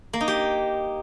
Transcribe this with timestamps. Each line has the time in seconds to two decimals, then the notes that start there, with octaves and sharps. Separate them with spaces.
0.13 A#3
0.21 D#4
0.28 G4